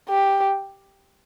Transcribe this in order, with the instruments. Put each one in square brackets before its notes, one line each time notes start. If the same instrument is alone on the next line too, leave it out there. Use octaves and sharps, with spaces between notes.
[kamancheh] G4